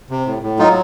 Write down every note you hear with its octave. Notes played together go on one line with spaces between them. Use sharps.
C3
A2
A2
F#3 D#4 F4